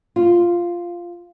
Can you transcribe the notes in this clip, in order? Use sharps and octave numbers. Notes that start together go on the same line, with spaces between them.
F4